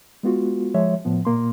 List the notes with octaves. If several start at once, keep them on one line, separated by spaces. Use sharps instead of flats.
G#3 B3 F4 F#4
F3 G#3 C#5 E5
A2 F3 B3
A#2 A#3 C6